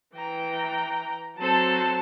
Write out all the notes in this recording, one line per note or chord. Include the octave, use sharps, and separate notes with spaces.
E3 G5 A#5
F#3 C4 A4 C5 A5